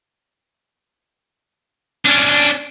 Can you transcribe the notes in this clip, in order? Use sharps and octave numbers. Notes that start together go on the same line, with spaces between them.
C#4 D4